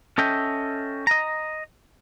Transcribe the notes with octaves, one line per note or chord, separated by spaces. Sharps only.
C#4 A4 D#5 E5 G5
D#5 A#5